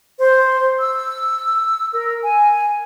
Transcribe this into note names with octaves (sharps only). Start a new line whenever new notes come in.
C5
E6
A#4
G#5